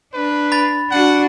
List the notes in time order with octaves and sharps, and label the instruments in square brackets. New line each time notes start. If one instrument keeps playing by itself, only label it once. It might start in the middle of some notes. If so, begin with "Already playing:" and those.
[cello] D4 [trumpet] B4
[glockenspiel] B5 A6
[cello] D4 F#4 [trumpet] F#5